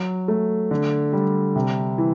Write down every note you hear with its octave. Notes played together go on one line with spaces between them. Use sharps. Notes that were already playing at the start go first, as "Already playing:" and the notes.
Already playing: F#3
A3
D3
G3
C3
E3